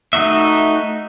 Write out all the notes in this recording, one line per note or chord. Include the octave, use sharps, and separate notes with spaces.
A3 D#4 F#4 E5